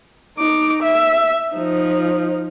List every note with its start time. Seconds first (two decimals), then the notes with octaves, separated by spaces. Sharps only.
0.38 D#4 D6
0.83 E5
1.53 F3 D#4